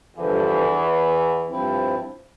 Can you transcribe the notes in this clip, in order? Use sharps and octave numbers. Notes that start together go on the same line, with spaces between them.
E2 G2 D3 E3 F3
G2 F3 C4 E4